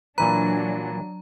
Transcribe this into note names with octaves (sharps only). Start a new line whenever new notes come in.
A#2 E3 F#3 D4 B4 A#5